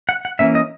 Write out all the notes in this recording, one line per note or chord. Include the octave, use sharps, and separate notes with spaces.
F#5
F#5
E3 A#3 C#4 E5
D#5